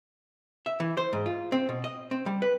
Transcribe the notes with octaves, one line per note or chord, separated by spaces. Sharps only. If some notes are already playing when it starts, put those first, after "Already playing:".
E5
E3
C5
G#2
F4
C4
B2
D#5
C4
G3
B4